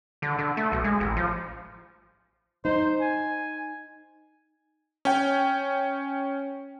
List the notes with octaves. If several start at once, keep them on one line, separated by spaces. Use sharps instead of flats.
D3
D3
A3
B1
G#3
A1
F3
D#4 C5
G#5
C#4 G5